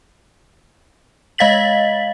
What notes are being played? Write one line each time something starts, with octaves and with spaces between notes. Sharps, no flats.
G#3 D#5 F5 A6 B6 F#7